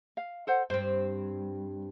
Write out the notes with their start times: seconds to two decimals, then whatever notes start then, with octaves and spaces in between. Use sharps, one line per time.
0.17 F5
0.47 A4 C5 F#5
0.70 G2 C4 C5